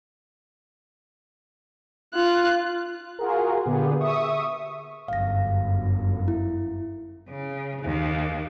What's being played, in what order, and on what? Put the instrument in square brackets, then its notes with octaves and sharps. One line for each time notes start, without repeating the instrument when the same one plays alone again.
[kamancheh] F4 F#6
[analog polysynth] F4 F#4 G#4 A#4
A#2 D3 B3 G4 G#4
E5 C#6 D#6
[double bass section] G1 F#2 [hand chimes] F5 A#6
[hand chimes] E4
[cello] C#3
D#2